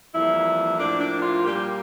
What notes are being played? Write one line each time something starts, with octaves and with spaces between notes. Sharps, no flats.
F2 E3 G3 A#3 E4
A2 F3 A#3 D4
D4
F4
A#2 G3 A#3 G4